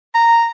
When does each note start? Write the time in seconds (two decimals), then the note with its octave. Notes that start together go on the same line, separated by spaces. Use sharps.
0.14 A#5